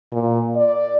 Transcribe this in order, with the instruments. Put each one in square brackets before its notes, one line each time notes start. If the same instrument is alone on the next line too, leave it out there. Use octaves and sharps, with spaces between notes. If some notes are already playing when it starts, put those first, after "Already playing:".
[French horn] A#2
D5